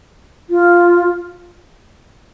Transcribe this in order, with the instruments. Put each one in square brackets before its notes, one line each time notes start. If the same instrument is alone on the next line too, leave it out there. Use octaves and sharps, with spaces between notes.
[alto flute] F4